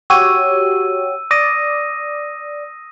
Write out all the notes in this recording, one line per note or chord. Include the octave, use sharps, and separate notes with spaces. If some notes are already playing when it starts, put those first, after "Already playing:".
F#4 G4 C#5 E6 D#7
D5 D#6 A#6 D#7